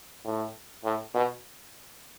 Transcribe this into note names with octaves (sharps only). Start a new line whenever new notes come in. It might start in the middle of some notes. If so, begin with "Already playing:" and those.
A2
A2
B2